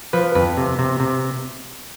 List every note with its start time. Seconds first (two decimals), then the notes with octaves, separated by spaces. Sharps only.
0.13 F3 B4
0.35 F2 B4
0.57 C3
0.79 C3
1.00 C3